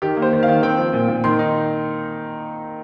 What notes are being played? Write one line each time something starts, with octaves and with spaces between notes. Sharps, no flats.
D#3 G4
A#3
C5
D#3
F5
D#3
C4 G5
F3
A#2
A#2
D#3 C6
D#4